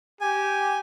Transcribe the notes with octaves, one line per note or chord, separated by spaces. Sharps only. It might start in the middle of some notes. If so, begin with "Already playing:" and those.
G4 G#5